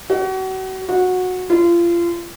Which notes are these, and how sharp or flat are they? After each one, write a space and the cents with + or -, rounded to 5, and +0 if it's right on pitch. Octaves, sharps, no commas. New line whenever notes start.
F#4 +35
F#4 -15
F4 -30